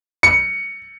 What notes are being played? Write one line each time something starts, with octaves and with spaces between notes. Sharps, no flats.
C#7